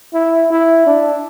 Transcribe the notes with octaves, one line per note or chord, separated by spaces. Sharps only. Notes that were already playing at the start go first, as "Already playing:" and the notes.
E4
E4
D4